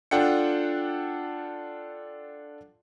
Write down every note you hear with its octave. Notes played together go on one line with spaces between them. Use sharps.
D4 F4 A4 F#5 G5 C#7